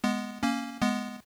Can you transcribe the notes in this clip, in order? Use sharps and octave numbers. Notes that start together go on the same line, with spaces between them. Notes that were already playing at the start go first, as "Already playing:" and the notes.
G#3 B3
A#3 C#4
G#3 B3